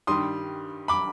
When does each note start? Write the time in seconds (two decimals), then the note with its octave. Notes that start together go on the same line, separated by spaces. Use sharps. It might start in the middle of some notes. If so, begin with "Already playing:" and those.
0.07 G2 D#3 G3 C6 D#6
0.88 B5 D6